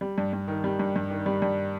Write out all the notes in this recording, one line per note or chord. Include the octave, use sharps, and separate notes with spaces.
G3
G2
G2
D#3
G3
G2
G2
D#3
G3
G2